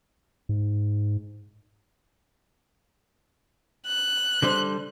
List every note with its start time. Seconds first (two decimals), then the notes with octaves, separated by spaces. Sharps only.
0.49 G#2
3.87 F#6
4.42 D3 G3 C5